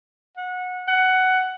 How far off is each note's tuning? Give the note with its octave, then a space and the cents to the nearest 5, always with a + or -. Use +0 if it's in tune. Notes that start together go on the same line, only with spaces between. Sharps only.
F#5 -20
F#5 +10